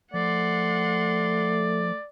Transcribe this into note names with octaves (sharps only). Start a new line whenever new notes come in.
F3 A3 D5 F#5 C6